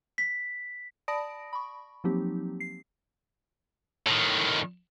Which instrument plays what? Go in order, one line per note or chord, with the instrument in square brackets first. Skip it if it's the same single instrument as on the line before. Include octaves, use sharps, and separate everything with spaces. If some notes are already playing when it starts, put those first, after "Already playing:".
[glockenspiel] B6
[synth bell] D5 A5 B5 D#6 A#6 D7
B5 C#6
F3 F#3 A#3 C4 D#4 G4
C7
[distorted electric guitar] A2 D#3